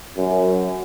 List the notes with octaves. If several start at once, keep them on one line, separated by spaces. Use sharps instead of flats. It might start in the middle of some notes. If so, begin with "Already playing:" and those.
F#2